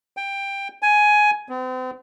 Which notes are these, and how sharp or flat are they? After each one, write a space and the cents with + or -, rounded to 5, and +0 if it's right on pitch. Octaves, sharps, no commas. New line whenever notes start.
G5 +15
G#5 +10
C4 -40